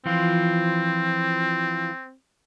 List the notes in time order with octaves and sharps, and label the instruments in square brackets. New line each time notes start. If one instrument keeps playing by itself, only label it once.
[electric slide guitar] E3 F3 F4 [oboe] C4